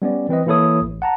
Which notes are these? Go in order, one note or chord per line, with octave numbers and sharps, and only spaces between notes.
G3 B3 C#4 D5
E3 C4 B4 D#5
E3 A#3 E4 A4 C#5 D#6
A1
F#5 A5 A#5